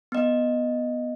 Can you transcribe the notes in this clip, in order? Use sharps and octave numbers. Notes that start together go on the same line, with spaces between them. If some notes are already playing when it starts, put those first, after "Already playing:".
B3 D#5